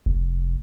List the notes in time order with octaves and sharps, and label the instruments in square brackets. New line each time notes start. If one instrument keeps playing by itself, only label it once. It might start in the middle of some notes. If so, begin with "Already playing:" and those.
[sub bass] F1